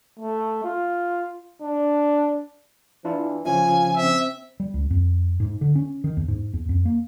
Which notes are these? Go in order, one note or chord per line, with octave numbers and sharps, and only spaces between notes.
A3
F4
D4
E3 D4 E4 F4
C#3 F3 C#4 F4 G#5
C4 E5
G3
C#2
F2
G#2
D3
C#4
D#3
E2
G#2
E2
F2
A#3